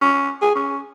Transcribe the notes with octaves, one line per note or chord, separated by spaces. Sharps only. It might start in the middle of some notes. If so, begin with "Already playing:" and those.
C#4
G#4
C#4